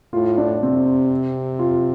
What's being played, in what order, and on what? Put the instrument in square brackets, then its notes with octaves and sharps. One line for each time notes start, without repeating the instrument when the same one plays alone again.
[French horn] A2 [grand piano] F4
[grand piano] D4
[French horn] C3 [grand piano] C4
[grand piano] F4